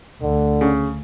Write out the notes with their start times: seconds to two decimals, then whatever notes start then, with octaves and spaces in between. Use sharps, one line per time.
0.22 D2 D3
0.61 C#3